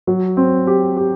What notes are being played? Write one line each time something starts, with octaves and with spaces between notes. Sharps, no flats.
F#3
C4
G4
G4